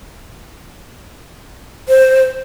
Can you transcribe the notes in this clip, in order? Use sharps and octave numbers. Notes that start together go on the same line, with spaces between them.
C5